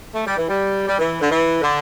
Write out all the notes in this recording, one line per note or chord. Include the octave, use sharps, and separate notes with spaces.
A3
G3
E3
G3
G3
E3
D3
E3
D3